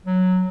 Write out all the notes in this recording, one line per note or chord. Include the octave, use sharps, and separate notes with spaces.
F#3